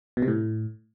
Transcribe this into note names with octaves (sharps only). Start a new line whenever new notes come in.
B2
C3
A2